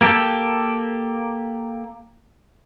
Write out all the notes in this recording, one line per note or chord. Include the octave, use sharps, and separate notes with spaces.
A#3 G4 A4 G5